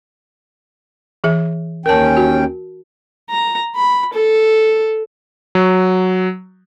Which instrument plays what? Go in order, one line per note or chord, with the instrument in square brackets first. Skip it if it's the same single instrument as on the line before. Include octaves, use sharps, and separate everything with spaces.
[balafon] E3 G#4 E5
[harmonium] D#2 C#4 G5 [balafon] A#4 A5
[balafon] F#4
[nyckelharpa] A#5
B5
A4
[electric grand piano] F#3